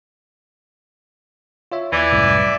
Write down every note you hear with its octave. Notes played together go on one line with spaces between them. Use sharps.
F4 C#5 E5
D#2 E3 D5 E5 G#6
C2 F#2 A2